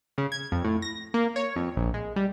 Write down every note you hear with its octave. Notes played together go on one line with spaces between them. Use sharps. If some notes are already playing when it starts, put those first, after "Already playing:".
C#3
G#6
F2
A2
A#6
A#3
C#5
F2
A#1
G#3
G3